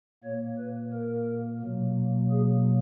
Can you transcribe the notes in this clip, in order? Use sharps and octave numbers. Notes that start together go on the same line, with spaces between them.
A#2 A#3 C#5
B4
A#4
B2 F#3 A#3
G#4